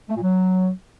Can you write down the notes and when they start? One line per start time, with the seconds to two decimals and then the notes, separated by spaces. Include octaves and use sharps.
0.08 A3
0.15 A#2
0.22 F#3